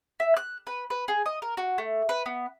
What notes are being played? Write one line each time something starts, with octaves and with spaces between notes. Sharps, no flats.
E5
F#6
B4
B4
G#4
D#5
A#4
F#4
A3
B4
B3